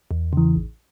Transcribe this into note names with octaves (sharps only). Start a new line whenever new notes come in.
E2
C#3 E3
A1